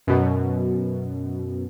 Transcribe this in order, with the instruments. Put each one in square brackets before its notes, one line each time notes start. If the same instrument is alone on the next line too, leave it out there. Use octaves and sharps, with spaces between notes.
[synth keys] F#2 B2